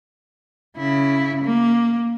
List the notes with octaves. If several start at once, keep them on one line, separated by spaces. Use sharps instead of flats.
C#3 E4
A#3